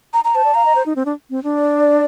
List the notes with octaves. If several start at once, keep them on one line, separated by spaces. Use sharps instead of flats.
A#5
A#5
C5 A5
D5
F5 A#5
D#5
C5
D#4
C4
D4
C4
D4
D5